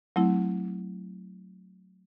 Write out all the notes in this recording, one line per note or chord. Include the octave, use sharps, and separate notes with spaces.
F#3 A3 C4 E4